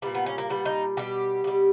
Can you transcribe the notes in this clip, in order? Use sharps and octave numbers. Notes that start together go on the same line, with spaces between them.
A#2 G3 B3
B3
C#4
A#3
A#2 G3 B3
D#4
B2 G3 G4
B2 G3